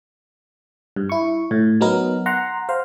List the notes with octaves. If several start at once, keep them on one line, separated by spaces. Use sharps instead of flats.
G2
E4 C#6
A2
F#3 B3 D#4 A#4
F#5 A#5 C6
C5 F5